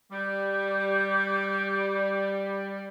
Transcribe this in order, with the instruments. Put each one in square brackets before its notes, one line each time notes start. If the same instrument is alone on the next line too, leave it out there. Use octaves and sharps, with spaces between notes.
[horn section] G3 [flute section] D6 G6